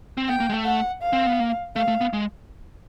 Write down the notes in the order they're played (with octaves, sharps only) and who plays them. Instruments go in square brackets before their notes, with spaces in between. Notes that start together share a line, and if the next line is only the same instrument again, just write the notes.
[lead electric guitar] C4
[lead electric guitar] B3 [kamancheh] G5
[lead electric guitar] A#3
G#3
A3
[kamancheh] F#5
F5
[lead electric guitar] C4
B3
A#3
[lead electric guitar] A3 [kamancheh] F5
[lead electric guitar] A3
B3
G#3